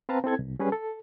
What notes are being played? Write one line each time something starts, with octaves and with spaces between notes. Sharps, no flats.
C4 B4 F5 A5 A#5
C4 E4 A4 G#6
C2
G3 C#4 G#4 B4
A4